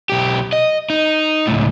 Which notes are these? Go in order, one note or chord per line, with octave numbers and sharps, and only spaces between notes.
B1 G4
D#5
D#4
C#2 A2